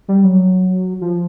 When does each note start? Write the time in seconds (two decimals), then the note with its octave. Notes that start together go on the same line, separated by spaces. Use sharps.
0.08 G3
0.24 F#3
1.01 F3